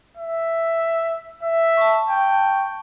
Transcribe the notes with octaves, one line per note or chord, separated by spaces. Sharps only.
E5
E5
A5 C#6
G5